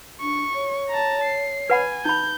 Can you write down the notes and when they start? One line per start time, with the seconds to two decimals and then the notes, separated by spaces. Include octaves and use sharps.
0.22 D4 C#6
0.55 C#5
0.89 A5 A#5
1.24 C7
1.70 B4 F#5 G#5 B5
2.05 D#4 B5 G6